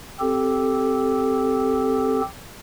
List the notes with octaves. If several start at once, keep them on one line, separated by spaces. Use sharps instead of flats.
C4 G4 A4